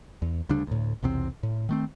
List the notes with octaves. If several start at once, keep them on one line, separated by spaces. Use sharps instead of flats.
E2
D2 C#3 G3 D4
D2 A2
B1 E2 C3 C4
A2
D#3 A3 C4